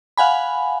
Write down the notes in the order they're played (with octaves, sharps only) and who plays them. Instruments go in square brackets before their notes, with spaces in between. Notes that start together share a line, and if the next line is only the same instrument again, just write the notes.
[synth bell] F5 F#5 G#5 B5